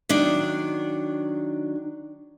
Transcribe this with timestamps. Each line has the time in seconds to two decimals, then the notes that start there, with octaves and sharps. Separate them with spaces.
0.09 D#3 F#3 D4